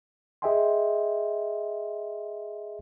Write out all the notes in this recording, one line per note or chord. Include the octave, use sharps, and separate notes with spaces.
G#4 D#5 E5 G5 G#5 C6